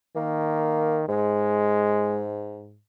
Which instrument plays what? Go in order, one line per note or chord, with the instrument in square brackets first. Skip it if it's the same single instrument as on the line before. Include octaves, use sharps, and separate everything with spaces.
[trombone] D#3 [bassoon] A#3
[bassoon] G#2 [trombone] G#3